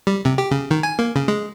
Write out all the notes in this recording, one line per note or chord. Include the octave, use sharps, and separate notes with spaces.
G3
C3
G4
C#3
D#3
G#5
A#3
C#3
G#3